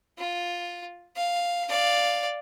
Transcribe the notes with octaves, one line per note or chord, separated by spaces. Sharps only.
F4
F5
D5 F5